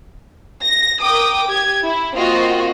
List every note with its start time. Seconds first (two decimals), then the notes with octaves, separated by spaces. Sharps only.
0.62 A#6
1.01 A#4 G5 D6 D#6
1.48 G4 G#6
1.84 E4
2.15 A#3 C4 F4 F#4 D#5